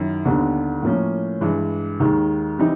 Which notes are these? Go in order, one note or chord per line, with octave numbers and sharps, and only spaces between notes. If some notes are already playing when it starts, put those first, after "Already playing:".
Already playing: F#2 D#3 E4
D#2 D3 G3 B3 D4
A2 F3 A#3 C#4
G2 E3 G#3
D#2 D#3 G#3
E3 G3 C4 D#4